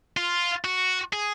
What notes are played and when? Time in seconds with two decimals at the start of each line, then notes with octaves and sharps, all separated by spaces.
0.17 F4
0.65 F#4
1.13 G#4